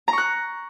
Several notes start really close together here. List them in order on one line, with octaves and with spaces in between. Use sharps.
A#5 C#6 F#6